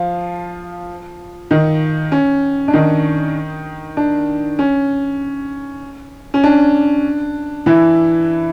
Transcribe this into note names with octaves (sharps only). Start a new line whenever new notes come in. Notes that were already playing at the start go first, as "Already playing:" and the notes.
Already playing: F3 F4
D#3 D#4
C#4
D4
D#3 D#4
D4
C#4
C#4
D4
E3 E4